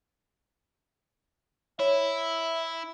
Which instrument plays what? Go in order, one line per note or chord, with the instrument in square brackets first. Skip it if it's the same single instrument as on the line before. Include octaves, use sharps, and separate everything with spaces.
[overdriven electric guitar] E4 [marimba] C#5 [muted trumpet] E5